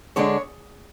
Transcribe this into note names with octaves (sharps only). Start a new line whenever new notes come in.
D3 G#3 D4 C#5